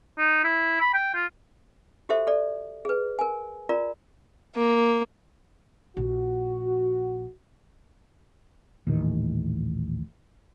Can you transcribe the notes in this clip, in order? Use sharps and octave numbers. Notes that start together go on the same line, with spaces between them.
D#4
E4
B5
G5
F4
F#4 G4 A4 C5 E5
A4 D5
G#4 B4
A#4 G#5
F4 A#4 D5 A#5
A#3
A#1 F#4
D#1 A1 D#3